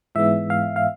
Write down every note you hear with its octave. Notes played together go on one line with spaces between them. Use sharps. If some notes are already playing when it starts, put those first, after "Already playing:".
G#2 E3 G#3 B3 E5
F5
F5